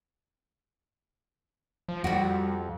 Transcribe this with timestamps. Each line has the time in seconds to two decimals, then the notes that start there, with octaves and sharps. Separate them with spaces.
1.88 F3
2.04 F2 G3 F#4